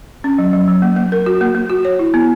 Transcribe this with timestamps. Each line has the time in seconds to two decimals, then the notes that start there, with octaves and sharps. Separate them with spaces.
0.24 C#4
0.39 F#3
0.53 F#3
0.68 F#3
0.82 A#3
0.96 A#3
1.12 A#4
1.26 F#4
1.41 A#3
1.55 A#3
1.70 F#4
1.85 C#5
1.99 E4
2.14 B3